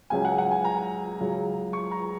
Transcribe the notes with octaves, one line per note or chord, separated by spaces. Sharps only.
C#2 C#3 F#3 C#4 G#5
F#5
F#5
G#5
A#5
C#2 C#3 F#3
C#6
A#5